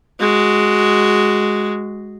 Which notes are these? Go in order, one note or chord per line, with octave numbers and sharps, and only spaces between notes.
G#3 F#4